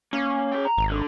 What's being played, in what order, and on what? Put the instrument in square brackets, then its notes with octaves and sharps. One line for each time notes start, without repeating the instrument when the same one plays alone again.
[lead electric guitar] A#3 [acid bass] C#4
[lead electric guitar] G#4 G5
A#5
[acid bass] G#1
[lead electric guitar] D3